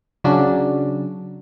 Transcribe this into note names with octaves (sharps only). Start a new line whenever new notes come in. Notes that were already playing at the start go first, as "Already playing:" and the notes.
C#3 F#3 C#4 D4